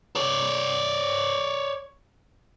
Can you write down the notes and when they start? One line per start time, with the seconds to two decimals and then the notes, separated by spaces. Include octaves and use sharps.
0.16 C#5 D5